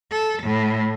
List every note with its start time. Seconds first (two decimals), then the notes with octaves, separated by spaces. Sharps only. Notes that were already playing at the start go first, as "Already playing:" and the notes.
0.11 A4
0.44 A2